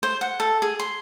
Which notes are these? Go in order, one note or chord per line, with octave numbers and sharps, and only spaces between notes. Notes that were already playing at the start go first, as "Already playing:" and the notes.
C5
F#5
A4
G#4
C6